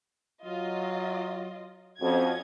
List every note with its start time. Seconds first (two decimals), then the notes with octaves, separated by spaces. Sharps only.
0.45 F#3 F4 D#5
2.01 F2 C#4 F#4 D#5 G#6